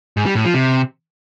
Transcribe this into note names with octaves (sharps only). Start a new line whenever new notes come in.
G#2
G3
A2
F3
C3